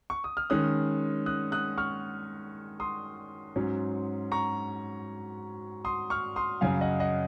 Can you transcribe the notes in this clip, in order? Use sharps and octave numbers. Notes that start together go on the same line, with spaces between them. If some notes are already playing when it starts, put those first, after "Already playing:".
C#6
D#6
F6
D#3 G#3 C#4 D#6 F#6
D#6 F#6
D#6 F#6
C#6 F6
C6 D#6
G#2 F#3 C#4
A#5 C#6
C6 D#6
C#6 F6
C6 D#6
F#2 C#3 F#3 C#4 F5 G#5
D#5 F#5
D#5 F#5